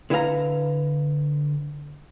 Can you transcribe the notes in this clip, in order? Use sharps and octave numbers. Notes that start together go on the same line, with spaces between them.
D3 E4 B4 D#5 F5 A#5